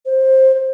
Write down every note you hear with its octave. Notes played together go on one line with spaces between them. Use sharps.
C5